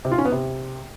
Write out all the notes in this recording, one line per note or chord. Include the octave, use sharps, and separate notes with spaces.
C3
F4
C#4
B3
C3